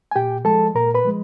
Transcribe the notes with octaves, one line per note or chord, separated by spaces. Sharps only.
G#5
A#2 G4 G5
F3 G#3 A4 A5
A#2 A#4 A#5
B4 B5
F3 G#3